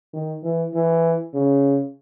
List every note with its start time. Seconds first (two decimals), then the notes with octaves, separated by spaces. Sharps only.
0.13 D#3
0.43 E3
0.74 E3
1.33 C#3